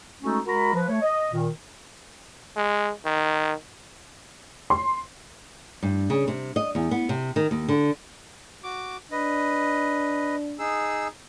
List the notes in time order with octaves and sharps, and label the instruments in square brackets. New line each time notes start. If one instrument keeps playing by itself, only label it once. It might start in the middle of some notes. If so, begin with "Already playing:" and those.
[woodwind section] G#3 A3 C#4 D#4 F#4 A4
G#3 F#4 A#4 A#5 B5
F3 B4
A3 C#5
D#5
A#2 D#3
[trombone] G#3
D#3
[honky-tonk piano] C6
[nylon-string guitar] G2
C#3
C3
D#5
E2
B3
C3
D#3
D#2
D3
[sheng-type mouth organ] F#4 D6
[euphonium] D4 [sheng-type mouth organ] B4 D#5
[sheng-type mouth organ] D#4 G#4 E6